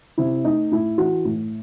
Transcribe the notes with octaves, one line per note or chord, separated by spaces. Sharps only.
C3 E4
A3 D#4
A2 E4
E3 F#4
A2